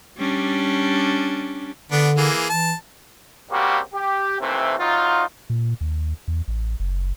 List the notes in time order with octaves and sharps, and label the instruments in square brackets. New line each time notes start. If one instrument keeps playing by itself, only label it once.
[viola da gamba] G3 C#4 D4
[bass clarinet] D3 [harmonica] B3 D4
[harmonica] E3 A#3 G#4
[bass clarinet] E3 [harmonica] A5
[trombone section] C#3 G3 A#3 C4 F#4 G4
G4
D#2 C3 E3 A3 C4
E2 F#3 D#4 F4
[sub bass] A#2
D#2
E2
A1
F#1